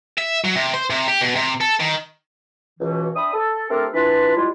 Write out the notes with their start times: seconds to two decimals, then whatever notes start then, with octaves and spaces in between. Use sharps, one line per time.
0.18 E5
0.44 F#3
0.56 C3
0.74 C5
0.90 C3
1.08 G4
1.21 B2
1.35 C3
1.61 A4
1.80 D#3
2.80 C#2 B2 E3
3.16 C4 D4 E5 B5 D#6
3.34 A4
3.69 A3 C4 D4 G4 A4 A#4
3.93 E3 D4 F4 B4
4.36 F3 G3 G#3 E4 F4